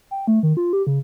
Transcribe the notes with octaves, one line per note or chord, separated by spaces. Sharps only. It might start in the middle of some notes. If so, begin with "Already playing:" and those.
G5
A3
D#3
F4
G4
C#3